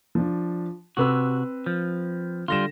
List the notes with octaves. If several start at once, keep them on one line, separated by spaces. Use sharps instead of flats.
F3 D4
C3 C4 F#4 B4 E6
F3
D3 G3 F4 A#6 E7